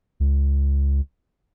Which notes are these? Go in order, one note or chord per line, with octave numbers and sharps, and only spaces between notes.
C#2